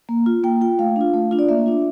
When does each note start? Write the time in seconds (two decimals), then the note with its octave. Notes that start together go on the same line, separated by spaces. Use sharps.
0.09 A#3
0.26 F4
0.44 A#3 G5
0.61 F4 G5
0.79 A3 F5
0.96 D4 F4
1.14 A3
1.31 D4 F4
1.39 D5
1.49 A#3 E5
1.66 D4 F4